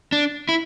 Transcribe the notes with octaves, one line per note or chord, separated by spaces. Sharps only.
D4
E4